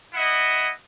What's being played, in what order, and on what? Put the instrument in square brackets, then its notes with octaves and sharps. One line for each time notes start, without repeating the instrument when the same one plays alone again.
[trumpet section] E4 D#5 F#5